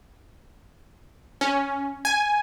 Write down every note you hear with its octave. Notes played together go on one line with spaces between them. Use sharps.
C#4
G#5